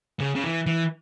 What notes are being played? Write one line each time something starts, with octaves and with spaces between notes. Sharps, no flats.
C#3
C#3
E3
E3